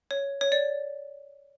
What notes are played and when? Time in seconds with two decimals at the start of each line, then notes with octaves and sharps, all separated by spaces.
0.11 C#5
0.41 C#5
0.52 D5